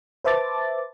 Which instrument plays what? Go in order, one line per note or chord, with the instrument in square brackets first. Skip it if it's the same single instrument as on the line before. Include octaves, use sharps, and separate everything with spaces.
[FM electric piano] B4 C5 E5 A5 D6 A6